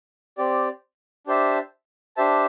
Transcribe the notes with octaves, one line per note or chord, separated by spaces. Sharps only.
C4 G4 D5
D4 G4 C5 E5 A5
D4 G4 C5 E5 A5